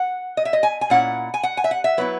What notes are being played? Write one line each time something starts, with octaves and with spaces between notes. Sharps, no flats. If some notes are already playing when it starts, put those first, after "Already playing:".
Already playing: F#5
D#5
E5
D#5
G#5
G#5
A#2 A#3 C#4 E4 F#5
G#5
F#5
G#5
E5
F#5
E5
F#3 B3 E4 B4